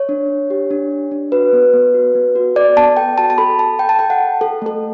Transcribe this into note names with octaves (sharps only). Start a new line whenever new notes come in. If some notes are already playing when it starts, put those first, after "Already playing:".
Already playing: C#5
D4
D4
G4
D4
G4
D4
F#4 B4
B3
B3
F#4
B3
F#4
A4 D5
B3 A5
A4 G5
F#4 A5
A5
A4 B5
A4 A5
A4 G5
A5
A4 G5
F#5
A4
A4
A3 A4